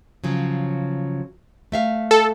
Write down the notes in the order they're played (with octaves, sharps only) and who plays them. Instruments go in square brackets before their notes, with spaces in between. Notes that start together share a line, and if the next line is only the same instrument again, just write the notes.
[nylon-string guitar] C#3 F3 F#3
A3 E5 F5
[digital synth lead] A4